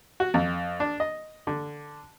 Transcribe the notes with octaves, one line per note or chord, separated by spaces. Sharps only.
F#4
F2
D4
D#5
D3